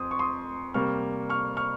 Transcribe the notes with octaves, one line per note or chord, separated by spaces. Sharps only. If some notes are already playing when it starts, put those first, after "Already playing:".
Already playing: F2 C6 D#6
C#6
C6 D#6
C3 G3 A#3 C#6 F6
C#6 F6
C#6 F6